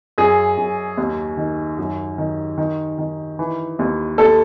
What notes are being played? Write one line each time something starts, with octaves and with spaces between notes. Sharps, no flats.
F#2 G#4
F#2
D#2
D#3
F#2
D#3
D#3
D#3
E3
D#2
D#2 A4